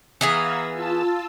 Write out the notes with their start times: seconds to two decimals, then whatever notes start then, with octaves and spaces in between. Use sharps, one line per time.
0.21 E3 B3 G#4 F5 A#5 E6
0.74 F4 A5 E6